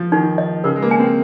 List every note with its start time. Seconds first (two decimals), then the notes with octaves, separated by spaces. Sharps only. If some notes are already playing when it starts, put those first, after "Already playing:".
Already playing: F3
0.12 D#3 D#4
0.38 D#5
0.64 C#3 A#4
0.76 G#3
0.82 A#3
0.91 G#5
0.99 C4